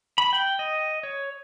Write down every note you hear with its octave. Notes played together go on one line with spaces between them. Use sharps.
B5
G5
D#5
C#5